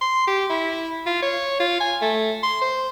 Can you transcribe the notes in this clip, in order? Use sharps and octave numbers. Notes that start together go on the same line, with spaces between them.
C6
G4
E4
F4
C#5
F4
G#5
A3
C6
C5